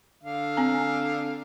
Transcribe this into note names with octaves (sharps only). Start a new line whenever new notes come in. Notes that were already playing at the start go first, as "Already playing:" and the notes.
D3 F5
C4 G#5 A#5